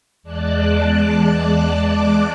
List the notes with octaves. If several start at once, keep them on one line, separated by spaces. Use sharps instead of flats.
E2 G#3 D5 A5 D6 F#6